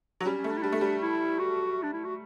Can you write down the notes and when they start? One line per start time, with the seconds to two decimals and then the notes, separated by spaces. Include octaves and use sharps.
0.21 F#3
0.26 G3 C#4
0.38 C#4
0.44 A3
0.51 D4
0.58 E4
0.63 G3 D4
0.72 A3
0.81 G3
1.02 E4
1.39 F#4
1.83 D4
1.93 E4
2.04 F#4